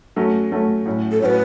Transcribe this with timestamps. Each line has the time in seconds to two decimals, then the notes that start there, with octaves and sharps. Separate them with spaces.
0.16 F#3 A3 C#4
0.52 F#3 A3 C#4
0.86 A2 F#3 C#4 F#4
1.11 A4
1.21 A2 F#3 C#4 F#4 B4 C#5